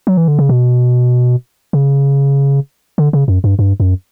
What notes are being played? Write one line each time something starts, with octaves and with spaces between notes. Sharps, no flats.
F#3
E3
D3
C#3
B2
C#3
D3
C#3
F#2
G2
G2
F#2